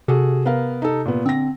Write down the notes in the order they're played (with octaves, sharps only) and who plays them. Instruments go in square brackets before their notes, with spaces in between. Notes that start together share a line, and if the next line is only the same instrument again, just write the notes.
[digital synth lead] C3 [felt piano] F#4 G#4 A4
[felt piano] B3 A#4 F5
D#4 A4
A#2 B3
[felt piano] D3 A#6 [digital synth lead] C4